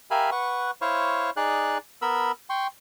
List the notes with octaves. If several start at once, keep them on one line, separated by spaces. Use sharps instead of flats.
G4 A#4 E5 F5 G#5 B5
B4 F#5 C#6
E4 C5 C#5 F5 C#6
D#4 G#4 D5 F#6
B3 A#4 B5 E6
G5 C6 C#6